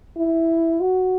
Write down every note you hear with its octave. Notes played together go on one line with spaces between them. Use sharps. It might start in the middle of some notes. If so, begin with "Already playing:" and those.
E4
F#4